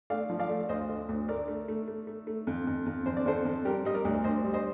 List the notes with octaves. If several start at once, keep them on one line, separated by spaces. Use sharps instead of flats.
A3 D5 F5
F3
D5 F5
A3
D2 C5 D#5
D3
D2
A3 A#4 D5
A3
A3
A3
A3
A3
F2
F2
F2
F2 C5
D5
F2 A4 C5
F2
G3 G4 A#4
G3 D#5
A#4 D5
D2
D2 C5 D#5
G3
C5 D#5